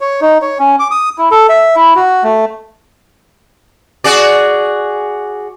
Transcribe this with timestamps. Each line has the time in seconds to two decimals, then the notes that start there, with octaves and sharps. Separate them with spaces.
0.01 C#5
0.21 D#4
0.42 C#5
0.59 C#4
0.80 D6
0.91 D#6
1.18 E4
1.31 A4
1.49 E5
1.76 E4
1.96 F#4
2.24 A3
4.04 F#4 G#4 D5